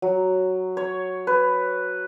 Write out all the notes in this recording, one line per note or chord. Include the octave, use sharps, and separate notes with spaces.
F#3
C#5
B4